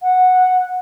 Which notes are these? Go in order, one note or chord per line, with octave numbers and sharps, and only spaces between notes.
F#5